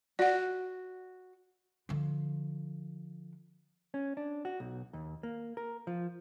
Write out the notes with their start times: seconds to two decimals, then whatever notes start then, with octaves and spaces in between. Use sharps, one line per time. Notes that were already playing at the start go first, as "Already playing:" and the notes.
0.19 F#4 D5 F#5
1.89 D3 F3
3.94 C#4
4.17 D4
4.45 F#4
4.60 B1
4.93 D#2
5.23 A#3
5.57 A#4
5.87 F3